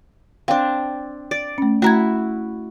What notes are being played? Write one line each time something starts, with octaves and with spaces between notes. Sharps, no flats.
C4 D4 F5
D5
A3 C#4
A3 E4 F#4 A#5 G#6